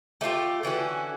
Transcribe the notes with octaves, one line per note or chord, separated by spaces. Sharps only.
A3 D4 F4 G4
D3 E3 C#4 F#4